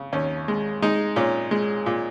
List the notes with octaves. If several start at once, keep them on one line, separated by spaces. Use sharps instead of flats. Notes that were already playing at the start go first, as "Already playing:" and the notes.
Already playing: C#3
D#2 C#4
G#3
G#3 D#4
A#2 C#4
G#3
A#2